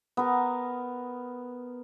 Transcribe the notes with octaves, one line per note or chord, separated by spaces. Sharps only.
B3 A#4